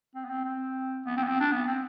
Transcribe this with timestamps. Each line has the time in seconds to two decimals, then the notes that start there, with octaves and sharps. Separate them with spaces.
0.15 C4
0.24 B3
0.30 C4
0.44 C4
1.06 B3
1.17 C4
1.23 B3
1.28 C4
1.40 D4
1.52 B3
1.67 C4